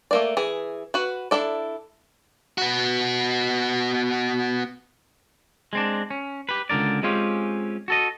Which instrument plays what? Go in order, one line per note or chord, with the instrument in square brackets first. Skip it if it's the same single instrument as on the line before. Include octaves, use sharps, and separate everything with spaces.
[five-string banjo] A3 A#3 D5
E3 G#4
F#4 B4
D4 E4 A4 D5
[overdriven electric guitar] B3 F#4
[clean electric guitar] G#3 C4 D4
C#4
G4 B4
C#2 B2 D3 A#4 D5
G#3 C4 C#4 F4 G4
F#4 A4 D#5